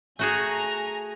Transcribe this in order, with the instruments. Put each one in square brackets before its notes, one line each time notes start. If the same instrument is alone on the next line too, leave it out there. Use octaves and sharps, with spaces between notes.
[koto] A3 F#4 G#4 [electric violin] G#5 A#5